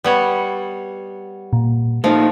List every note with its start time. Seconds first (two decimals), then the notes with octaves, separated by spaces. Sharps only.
0.04 G3 B3 C#5
1.53 A#2
2.04 F3 A3 A#3 D#4